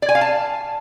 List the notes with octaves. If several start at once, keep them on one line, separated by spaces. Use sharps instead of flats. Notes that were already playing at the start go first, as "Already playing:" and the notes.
D5
G#5
F5
A5